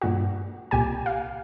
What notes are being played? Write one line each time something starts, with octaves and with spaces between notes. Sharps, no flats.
G2 A#2 F#4
C2 A#2 G4 G#5
F5